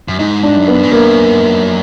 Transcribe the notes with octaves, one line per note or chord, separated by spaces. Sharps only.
F#2
G#2 D#4
D4
F#2
B3
G#2
F#2 A#3